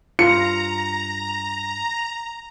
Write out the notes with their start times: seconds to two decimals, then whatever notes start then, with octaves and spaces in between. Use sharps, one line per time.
0.19 G2 F4 A#5 C#7